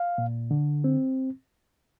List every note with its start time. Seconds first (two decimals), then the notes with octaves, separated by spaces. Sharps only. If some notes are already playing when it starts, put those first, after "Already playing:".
Already playing: F5
0.18 A#2
0.51 D3
0.84 C4